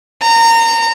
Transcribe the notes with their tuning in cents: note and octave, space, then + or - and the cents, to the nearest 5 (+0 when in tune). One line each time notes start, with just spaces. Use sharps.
A#5 -25